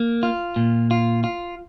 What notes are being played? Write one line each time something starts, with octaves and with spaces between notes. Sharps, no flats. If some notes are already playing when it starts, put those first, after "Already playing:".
Already playing: A#3
F4
A#2
F4
F4